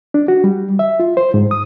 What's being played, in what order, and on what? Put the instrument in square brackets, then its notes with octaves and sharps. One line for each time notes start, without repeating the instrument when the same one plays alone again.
[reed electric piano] D4
F#4
G3
E5
F4
C5
G#2
D#6